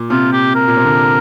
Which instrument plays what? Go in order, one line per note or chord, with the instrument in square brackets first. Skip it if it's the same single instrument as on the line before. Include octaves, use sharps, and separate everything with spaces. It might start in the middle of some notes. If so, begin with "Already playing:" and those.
Already playing: [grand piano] A#2
[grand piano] C3 [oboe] F4
[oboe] G4
A#4
[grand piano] A#2
C3
D3